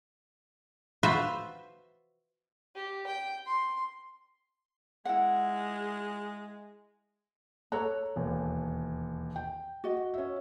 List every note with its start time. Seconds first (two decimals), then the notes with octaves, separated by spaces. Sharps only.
1.03 F4 F#4 B4 C5 E5
2.75 G4
3.07 G5
3.46 C6
5.05 G#3 E4 F#5
7.72 A4 C#5 A#5 F#6
8.16 E1 D#2
9.36 G5
9.84 F#4 D#5
10.14 C#4 E5